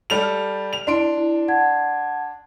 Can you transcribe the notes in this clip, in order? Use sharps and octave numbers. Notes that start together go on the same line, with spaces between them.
G3 A4 F7
F6
F7
D4 E4 C6 D7
E4
F#5 A5 G#6